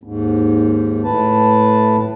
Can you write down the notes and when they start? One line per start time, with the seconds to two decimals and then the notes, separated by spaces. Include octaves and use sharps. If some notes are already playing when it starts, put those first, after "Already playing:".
0.04 D#2 G#2
1.04 A2 B4 A5